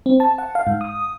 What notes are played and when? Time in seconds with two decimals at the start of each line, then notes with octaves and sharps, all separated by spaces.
0.06 C4
0.20 A5
0.38 F#5
0.55 F5
0.67 G#2
0.81 D#6